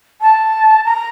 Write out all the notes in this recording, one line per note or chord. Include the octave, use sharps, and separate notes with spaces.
A5
A#5